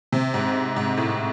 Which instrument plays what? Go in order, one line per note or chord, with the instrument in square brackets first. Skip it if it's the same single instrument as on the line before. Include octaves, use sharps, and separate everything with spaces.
[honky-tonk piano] C3
G#2
G#2
A2